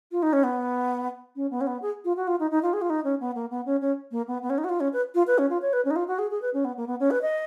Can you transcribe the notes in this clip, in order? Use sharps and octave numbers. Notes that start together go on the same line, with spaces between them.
F4
D#4
C#4
B3
C#4
B3
C#4
B3
G#4
F4
F#4
F4
D#4
D#4
F4
G#4
F4
D#4
C#4
B3
A#3
B3
C#4
C#4
A#3
B3
B3
C#4
D#4
F#4
F4
C#4
B4
F4
B4
C#4
F4
C#5
B4
C#4
D#4
F4
F#4
G#4
G#4
B4
C#4
B3
A#3
B3
C#4
B4
D#5